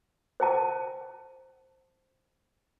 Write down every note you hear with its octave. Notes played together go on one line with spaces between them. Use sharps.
C5 G5 A5